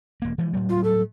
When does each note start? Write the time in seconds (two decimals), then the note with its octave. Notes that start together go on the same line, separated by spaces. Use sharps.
0.22 E1 A#3
0.38 E3 F3 G#3
0.53 A2 F#3 G3
0.69 F4
0.84 A4